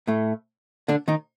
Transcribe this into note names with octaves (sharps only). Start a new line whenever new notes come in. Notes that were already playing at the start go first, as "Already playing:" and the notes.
A2 A3
D3 D4
D#3 D#4